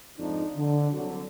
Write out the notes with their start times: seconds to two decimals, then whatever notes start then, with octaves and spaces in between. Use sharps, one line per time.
0.18 F2 G#2 F3 D4 D#4
0.56 D3
0.91 C2 D3 F#3